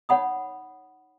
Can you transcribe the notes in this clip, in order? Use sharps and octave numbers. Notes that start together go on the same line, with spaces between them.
D#4 C#5 F#5 B5 D#6